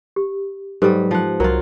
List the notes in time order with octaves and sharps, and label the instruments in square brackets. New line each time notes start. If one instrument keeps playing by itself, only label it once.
[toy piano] G4
[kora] G#2 G3 [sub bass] F#3 [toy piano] G4 A4 B4
[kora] F3 F#5
[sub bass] C2 [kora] F#3 F4 [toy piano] A#4 D5 A#5